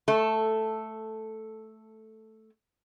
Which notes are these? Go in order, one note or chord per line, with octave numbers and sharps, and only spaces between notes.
A3 A4